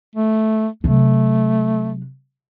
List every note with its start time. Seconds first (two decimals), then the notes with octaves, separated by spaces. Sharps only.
0.16 A3
0.84 C3 F#3 A3